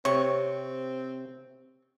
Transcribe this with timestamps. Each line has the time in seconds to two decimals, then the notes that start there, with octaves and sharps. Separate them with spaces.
0.05 C3 C4 C#5 C#6